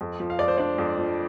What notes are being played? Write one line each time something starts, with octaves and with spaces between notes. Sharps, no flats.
F2
F3
F5
F2 D5
C5
D4 D5
F2
F3